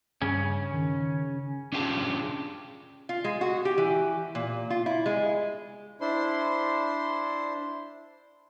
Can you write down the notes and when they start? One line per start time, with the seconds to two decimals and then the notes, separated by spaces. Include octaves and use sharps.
0.22 G2 C#3 C#4
0.74 D#3
1.72 C#4 D4 F4 G4 G#4 A5
3.09 F4
3.24 G#3
3.41 F#4
3.65 G4
3.78 E3
4.35 A#2
4.70 F4
4.86 E4
5.06 G#3
6.01 D4 E4 C5 C6